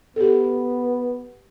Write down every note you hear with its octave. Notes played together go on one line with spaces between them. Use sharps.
B3 G4 A4